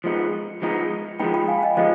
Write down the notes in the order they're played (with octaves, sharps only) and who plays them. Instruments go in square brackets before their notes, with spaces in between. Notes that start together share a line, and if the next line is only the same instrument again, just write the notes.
[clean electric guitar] F3 G#3 B3 D#4
F3 G#3 B3 D#4
[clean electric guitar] F3 G#3 B3 D#4 [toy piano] G5 B5
[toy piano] G5 B5
F5 G#5
F5
D#5 G5
[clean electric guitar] F3 G#3 B3 D#4 [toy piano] C5 D#5